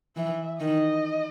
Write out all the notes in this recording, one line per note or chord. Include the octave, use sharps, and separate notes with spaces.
E3 E5
D#3 D#5